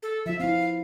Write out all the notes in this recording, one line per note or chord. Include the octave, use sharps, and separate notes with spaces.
A4
F3 F4 E5
C4 E4 F5